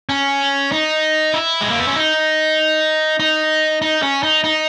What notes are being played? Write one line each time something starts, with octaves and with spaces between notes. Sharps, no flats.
C#4
D#4
E4
G#3
A#3
B3
C#4
D#4
D#4
D#4
C#4
D#4
D#4